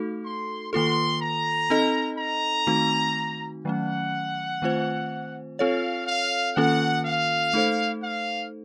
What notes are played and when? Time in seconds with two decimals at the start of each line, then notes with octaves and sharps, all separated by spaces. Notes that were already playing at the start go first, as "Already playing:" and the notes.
Already playing: A3 D#4 F#4 A4
0.24 C6
0.73 D#3 A#3 F4 A4 C6
1.21 A#5
1.70 C4 D#4 A4 D#5
2.18 A#5
2.67 D#3 A3 C4 D#4 F#4
3.65 D#3 F#3 A3 C#4 F#5
4.62 D#3 A3 C4 F4 C5
5.59 C4 F4 A4 C#5 F5
6.07 F5
6.56 D#3 A#3 C#4 F4 A4 F#5
7.05 F5
7.54 A3 D#4 A4 C5
8.02 F5